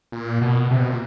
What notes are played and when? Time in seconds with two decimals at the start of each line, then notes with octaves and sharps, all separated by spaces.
0.12 A#2
0.41 B2
0.71 C3
0.80 B2
0.90 A#2